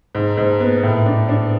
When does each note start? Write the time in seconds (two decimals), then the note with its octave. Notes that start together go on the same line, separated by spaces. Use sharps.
0.15 G#2
0.37 G#2
0.60 B3
0.83 A2
1.06 D4
1.29 D4